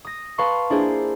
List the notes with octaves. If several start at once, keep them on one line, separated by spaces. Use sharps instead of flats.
D#6 A#6
B4 F5 A5 C6 C#6
A#3 D4 E4 F4 G#4 C5